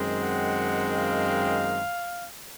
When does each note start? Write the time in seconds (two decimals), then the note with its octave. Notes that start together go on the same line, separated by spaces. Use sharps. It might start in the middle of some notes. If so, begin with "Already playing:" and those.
Already playing: F#2 D#3 G#3 C4
0.23 F#5
0.95 F5